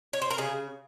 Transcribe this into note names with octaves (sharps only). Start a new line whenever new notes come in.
C#5
C5
A#4
C#3 G#4